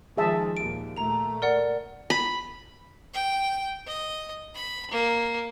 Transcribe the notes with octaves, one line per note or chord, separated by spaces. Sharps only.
D#3 F3 G#3 G#4 E5 A5
D#2 A#2 D7
A#2 A3 A#5 F7
A#4 D5 F#5
B5
G5
D#5
B5
A#3